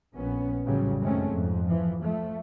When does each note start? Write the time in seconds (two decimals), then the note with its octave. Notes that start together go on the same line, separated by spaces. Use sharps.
0.15 A#1 B3 C#4
0.65 A1 F2 C#3 F#3 G3
1.00 F#2 D#3 G#3 A3 C4 C#4
1.32 F2 G#2
1.68 E3 F3
2.02 F3 A3